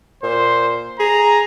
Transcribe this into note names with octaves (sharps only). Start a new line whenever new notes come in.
A#2 C5
G#4 A#5